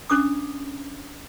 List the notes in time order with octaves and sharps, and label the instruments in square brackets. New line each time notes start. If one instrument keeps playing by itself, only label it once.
[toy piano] C#4 D4 D6 D#6